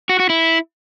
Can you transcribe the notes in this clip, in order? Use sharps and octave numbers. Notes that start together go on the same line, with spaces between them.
F#4
F#4
E4